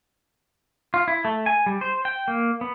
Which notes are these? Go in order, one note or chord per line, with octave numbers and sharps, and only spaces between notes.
F4
E4
A3
G#5
G3
C5
G5
A#3
B3